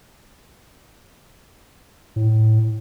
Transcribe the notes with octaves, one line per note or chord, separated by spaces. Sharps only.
A2